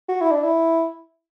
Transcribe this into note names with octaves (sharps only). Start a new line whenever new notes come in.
F#4
E4
D4
E4